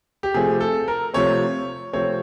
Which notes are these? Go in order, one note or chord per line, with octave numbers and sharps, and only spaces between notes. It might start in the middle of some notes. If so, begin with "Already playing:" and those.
G4
C3 F3 A3 C4 G#4
A4
A#4
C3 F3 A3 C4 C#5
C3 F3 A3 C4 C#5